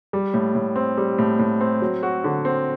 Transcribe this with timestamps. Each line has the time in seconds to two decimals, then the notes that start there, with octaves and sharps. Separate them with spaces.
0.13 G3
0.34 A2
0.55 A2
0.76 C4
0.98 G3
1.18 A2
1.39 A2
1.61 C4
1.82 F#3
2.03 F#4
2.24 D3
2.45 C4